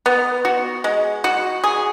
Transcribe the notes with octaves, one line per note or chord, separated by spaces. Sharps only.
B3
F#4
G#3
F#4
G#4